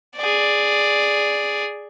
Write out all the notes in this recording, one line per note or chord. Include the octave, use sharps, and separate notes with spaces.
G#4 D5